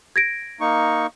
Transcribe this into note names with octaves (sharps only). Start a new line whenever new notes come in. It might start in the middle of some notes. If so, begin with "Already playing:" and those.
G#6 A#6 D7
A#3 D#4 C#6